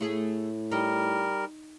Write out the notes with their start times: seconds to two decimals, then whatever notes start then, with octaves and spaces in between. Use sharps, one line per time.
0.01 A2 A3 G#4
0.72 G3 D#4 A#4